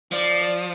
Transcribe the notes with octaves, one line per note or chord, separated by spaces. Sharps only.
F3 D5